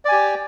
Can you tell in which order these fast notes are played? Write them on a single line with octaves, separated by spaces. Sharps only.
D5 G#5 G4